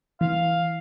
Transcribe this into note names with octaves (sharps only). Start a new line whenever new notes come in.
E3 F5